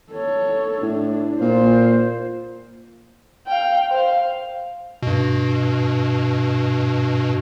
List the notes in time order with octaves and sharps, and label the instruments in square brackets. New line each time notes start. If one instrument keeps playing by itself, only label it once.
[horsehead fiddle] A4 C#5
[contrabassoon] A2 [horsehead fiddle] D4
[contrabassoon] A#2 [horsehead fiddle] F4 C5
[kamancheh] F5 G5
C5 F5
[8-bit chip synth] G2 B2